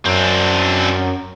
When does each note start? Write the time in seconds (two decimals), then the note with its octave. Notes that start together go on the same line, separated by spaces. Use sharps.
0.06 F#2 C4 D4